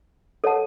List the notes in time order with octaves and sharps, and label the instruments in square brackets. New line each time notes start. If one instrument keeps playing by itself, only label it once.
[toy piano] A4 C#5 F#5 A5